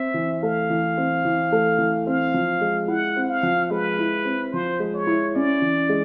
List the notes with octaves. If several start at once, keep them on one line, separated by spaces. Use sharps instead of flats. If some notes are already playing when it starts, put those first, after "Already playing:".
Already playing: C4 E5
E3
A3 F5
E3
C4
E3
A3
E3
C4 F5
F3
G#3
E4 F#5
C4
F5
F3
G#3 B4
E4
C4
F3 C5
G#3
C#5
E4
C#4 D5
E3
G#3